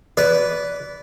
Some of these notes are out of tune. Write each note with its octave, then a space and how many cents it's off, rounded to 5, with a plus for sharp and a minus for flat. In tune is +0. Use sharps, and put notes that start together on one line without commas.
B4 +0 D5 -25